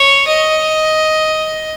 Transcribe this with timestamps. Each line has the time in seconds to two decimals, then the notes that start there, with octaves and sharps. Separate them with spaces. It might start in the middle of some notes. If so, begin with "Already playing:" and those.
Already playing: C#5
0.27 D#5